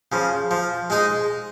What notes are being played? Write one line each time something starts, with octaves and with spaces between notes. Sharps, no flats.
C#3 F3
F3
G#3 D#4 G#4